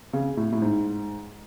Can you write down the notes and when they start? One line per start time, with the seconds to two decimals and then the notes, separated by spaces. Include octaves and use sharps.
0.13 C#3
0.37 A2
0.52 A2
0.62 G#2